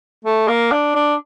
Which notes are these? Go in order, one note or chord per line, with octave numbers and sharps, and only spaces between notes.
A3
A#3
D4
D4